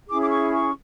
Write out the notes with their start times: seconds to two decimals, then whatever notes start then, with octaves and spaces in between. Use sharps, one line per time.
0.09 C#4 E4 G#4 D6
0.22 D6
0.31 C#6
0.53 C#6